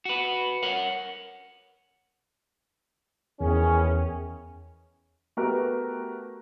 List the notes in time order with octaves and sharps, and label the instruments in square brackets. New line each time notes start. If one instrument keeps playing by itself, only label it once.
[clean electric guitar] F#4 B4
A#4 C#5 F#5
[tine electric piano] E2 [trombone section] D#3 E3 C#4 [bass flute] G#4
[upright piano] A3 B3 F#4 G4 A#4